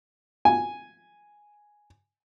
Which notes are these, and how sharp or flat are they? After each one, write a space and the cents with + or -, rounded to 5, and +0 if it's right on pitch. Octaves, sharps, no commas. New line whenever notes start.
G#5 +0